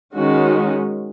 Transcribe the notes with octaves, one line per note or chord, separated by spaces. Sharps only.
D#3 G#3 C#4 F#4